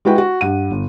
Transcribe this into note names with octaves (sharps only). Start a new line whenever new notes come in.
G#3 E4 F#4 B4 G5
F#4
G2 F#5 D#7
G1